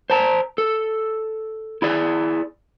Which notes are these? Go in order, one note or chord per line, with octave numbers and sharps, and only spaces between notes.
C5 A5 A#5
A4
E4 G#4 D5